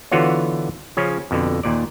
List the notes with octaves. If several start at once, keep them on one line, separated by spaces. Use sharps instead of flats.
D3 E3 B3 F4 F#4 C#5
C#3 F3 C#4
F2 B2 D3
D#2 A#2 D5